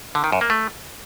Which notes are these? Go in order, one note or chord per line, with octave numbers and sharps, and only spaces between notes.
D3
D#3
F#2
A#3
A3